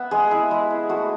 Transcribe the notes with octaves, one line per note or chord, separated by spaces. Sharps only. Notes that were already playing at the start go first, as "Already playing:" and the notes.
Already playing: B3 E5 F#5
G#3 G#4
E4
G#3
E4
A3 F#4